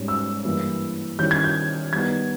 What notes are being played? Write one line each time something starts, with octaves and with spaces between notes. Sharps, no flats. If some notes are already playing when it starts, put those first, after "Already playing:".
Already playing: G#2 G3 C#4
E6
G2 E3 A#3 E4
D#3 G3 C#4 E4 G6
G#6
G6
D#3 G3 B3 D#4 G#6